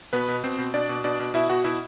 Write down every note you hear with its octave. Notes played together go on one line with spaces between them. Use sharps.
B2 B3 B4
B2
B2 C4 C5
B2
B2 D4 D5
B2
B2 D4 D5
B2
B2 E4 E5
B2 F#4 F#5
B2 E4 E5